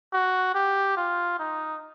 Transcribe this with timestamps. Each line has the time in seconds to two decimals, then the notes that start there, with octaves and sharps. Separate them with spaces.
0.13 F#4
0.54 G4
0.97 F4
1.39 D#4